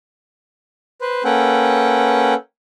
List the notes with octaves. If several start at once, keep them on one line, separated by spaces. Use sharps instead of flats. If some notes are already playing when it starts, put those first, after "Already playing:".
B4 C5
A#3 C#4 A4 B4 F#5 G5